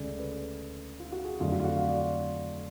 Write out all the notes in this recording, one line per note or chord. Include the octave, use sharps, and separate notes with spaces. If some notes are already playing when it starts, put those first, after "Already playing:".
Already playing: D2 C#3 G#3 D5
B4
F4
F#4
G#4
F2 D3 F#3 A3 D4 F4
F#4
F4
F#4
F5
D5